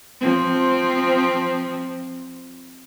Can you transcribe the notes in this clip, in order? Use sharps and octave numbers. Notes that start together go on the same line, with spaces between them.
F3 C4